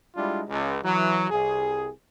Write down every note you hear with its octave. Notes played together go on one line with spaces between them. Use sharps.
G3 G#3 D4 E4 F4
C#2
E3 F#3
C2 G#4